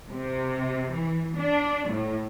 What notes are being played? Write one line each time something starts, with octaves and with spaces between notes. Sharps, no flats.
C3
E3
D4
A2